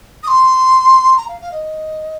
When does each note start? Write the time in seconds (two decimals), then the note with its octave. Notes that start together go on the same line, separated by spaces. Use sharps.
0.23 D#6
0.27 C6
1.17 A#5
1.28 F5
1.41 F5
1.52 D#5